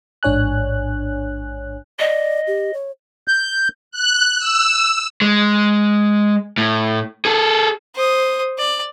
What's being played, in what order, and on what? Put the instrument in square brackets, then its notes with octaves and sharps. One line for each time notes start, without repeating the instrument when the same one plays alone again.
[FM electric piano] A1 G#2 D4 C#5 G#5 F#6
[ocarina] D5 [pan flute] D#5
[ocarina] G4
C#5
[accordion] G6
[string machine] F#6
E6
[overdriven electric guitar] G#3
A2
G#4 A4
[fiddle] C5 D#6
D5